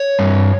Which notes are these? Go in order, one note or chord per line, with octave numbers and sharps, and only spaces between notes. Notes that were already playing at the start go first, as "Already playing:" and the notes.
Already playing: C#5
G2